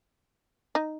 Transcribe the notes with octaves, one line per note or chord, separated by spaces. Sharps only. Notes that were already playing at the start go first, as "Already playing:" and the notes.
D#4